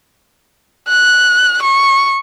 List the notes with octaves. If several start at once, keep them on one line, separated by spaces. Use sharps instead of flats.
F#6
C#6